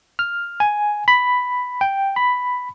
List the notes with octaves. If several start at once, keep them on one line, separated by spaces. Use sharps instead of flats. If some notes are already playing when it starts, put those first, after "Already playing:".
F6
G#5
B5
G5
B5